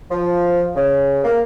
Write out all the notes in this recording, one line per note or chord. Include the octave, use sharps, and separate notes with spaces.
F3
C#3
A#3